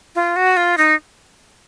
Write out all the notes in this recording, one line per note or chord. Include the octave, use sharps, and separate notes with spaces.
F4
F#4
F4
D#4